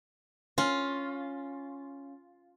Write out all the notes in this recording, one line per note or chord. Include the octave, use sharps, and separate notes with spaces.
C#4 F4